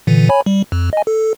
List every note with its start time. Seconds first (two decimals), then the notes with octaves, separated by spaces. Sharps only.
0.07 A#2 D3 E3
0.29 C#5 G#5 B5
0.46 G3
0.72 F2
0.93 D#5 G#5
1.07 A4